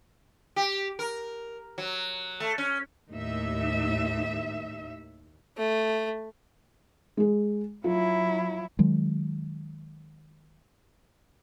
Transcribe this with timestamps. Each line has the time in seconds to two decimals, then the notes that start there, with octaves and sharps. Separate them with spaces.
0.56 G4
0.99 A#4
1.78 F#3
2.40 A3
2.58 C#4
3.09 D#2 A2 D#4 E5
5.57 A3
7.17 G#3 G#4
7.84 F#3 E4 F4
8.79 D#3 F#3 G#3